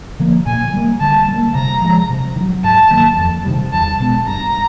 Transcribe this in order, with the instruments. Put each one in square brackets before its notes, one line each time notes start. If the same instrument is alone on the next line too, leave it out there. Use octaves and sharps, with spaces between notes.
[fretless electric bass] D3 F3 A#3
[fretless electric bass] A#2 [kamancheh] G#5
[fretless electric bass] G3 A#3
[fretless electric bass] D3 [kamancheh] A5
[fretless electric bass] G3 A#3
[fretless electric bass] C3 [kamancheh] A#5
[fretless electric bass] F3 G#3
C3
D#3
F#3
[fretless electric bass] G#2 [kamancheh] A5
[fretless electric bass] D#3 F#3 A#3
F2
C3 D#3 G3
[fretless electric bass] E2 [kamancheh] A5
[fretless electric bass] B2 G#3 B3
[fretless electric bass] G2 [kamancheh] A#5